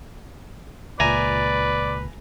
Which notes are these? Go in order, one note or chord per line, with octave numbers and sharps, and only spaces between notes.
C#2 A#2 B4 D5 E5 G#5 A#5